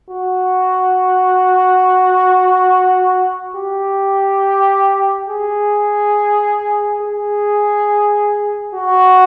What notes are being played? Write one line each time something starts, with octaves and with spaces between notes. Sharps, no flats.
F#4
G4
G#4
G#4
F#4